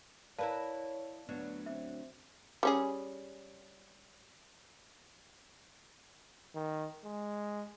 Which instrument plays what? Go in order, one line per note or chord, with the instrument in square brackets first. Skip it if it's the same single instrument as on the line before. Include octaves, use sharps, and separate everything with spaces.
[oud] E4 A#4 B4 [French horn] C#5 [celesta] D5 F5 A5
[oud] D2 F#3 D4 [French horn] B3
[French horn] C4 [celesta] E5
[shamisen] G3 C#4 G#4
[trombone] D#3
G#3